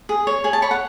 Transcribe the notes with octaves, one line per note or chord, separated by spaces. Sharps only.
G#4
C#5
G#4 G#5
A5
C#5 B5
F#5